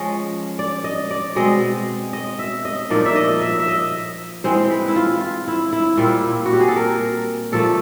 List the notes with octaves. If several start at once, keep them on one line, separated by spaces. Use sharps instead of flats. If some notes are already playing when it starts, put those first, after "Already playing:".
Already playing: F3 G#3 C#4 D#5
D5
D#5
D5
B2 G#3 C4 D#5
D#5
E5
D#5
A#2 F3 A#3 D#4 D5
E5
D#5
E5
E5
D#5
E3 G#3 C4 C5
B4
E4
F4
F4
E4
E4
A#2 G3 C4 E4 F4
F#4
G4
G#4
A4
A#4
A#2 F3 A3 A4